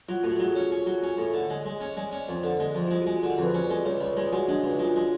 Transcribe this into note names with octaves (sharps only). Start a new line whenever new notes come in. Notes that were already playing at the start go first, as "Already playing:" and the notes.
F#3 F4
A2 F#4
A4
F#3 G#4
C#4 C#5
C#4
F#3
C#4
A2
D3
G#3
G#3
C#4
G#3 D5
C#4
F2
D3
G#3
F2
G#3 F4
G#3 F#4
G#4
D3
A4
F2
B4
C#4
D5
G#3
C#2 C#5
C#2 D5
G#3 G#4
G#3 F#4
G#3 D4
C#2
G#3 F4
G#3